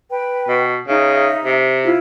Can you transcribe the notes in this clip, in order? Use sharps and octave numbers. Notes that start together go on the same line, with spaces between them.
B4 G5
B2
C#3 D#4 E5
C3
E4 F4